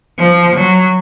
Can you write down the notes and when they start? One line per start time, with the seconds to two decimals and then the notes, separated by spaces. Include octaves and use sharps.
0.19 F3
0.56 F#3